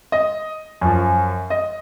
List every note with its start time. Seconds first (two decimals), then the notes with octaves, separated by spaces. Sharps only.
0.12 D#5
0.81 F#2 F3
1.50 D#5